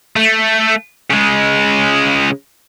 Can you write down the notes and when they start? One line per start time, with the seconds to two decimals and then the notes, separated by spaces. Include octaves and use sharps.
0.16 A3
1.10 C#3 G#3